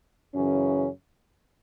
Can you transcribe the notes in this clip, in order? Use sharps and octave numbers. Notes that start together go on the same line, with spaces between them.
F#2 C#3 E3 C#4